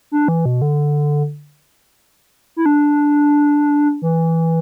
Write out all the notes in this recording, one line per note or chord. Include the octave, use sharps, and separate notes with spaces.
D4
E3
B2
D3
E4
D4
E3